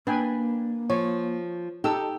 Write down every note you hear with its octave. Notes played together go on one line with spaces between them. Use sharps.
A#3 D4 B4 G5 G#5
F3 C#5
D#4 G4 A4 E6